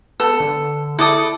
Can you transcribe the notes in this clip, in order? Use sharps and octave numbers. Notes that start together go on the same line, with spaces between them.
B3 A4
D3
E4 A4 D5 D#6